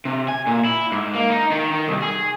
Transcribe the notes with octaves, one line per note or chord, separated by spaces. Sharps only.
C3
G#5
A#2
E4
G#2
A#3
D#4
D#3
D#3
C2
G#4